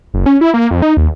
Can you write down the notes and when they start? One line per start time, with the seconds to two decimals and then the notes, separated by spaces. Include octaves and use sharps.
0.14 F#1
0.26 C#4
0.41 E4
0.54 A#3
0.71 F2
0.82 D#4
0.97 D#2